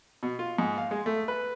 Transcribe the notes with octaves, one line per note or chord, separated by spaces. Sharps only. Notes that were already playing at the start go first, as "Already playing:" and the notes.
B2
F4
G#2
F5
G#3
A3
B4